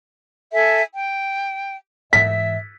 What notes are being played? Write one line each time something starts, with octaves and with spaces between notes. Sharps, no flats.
A4 E5 G#5
G5
G#2 E3 E5 B6